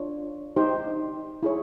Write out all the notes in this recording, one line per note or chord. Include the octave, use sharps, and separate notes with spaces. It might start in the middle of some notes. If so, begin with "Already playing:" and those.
Already playing: D4 F4 C#5
D#4 G4 C5
E4 G#4 C#5